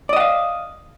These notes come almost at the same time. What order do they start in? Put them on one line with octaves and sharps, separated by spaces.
D5 D#5 F#5 F5